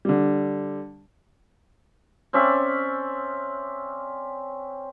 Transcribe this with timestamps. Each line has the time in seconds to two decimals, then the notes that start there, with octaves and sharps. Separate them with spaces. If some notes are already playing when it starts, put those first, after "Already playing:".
0.05 D3 G3
2.33 C4 C#4 D5 E5